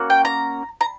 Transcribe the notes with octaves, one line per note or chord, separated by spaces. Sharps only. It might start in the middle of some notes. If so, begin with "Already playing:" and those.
Already playing: A#3 C#4 F#4
G5
A#5
A#5